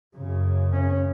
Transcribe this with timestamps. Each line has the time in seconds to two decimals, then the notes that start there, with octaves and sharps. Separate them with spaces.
0.14 F#2 C#3
0.73 C#4